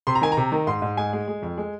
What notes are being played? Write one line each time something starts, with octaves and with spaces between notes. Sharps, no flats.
C3 C6
A#5
D#3 G#5
A#5
C3
D#3
G#2 C6
G#2
G#3 G#5
G#3
G#3
F2
G#3